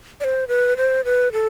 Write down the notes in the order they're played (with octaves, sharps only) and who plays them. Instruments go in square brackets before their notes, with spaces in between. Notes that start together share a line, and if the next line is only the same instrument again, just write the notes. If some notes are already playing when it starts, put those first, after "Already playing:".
[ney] D5
C5
B4
C5
B4
A4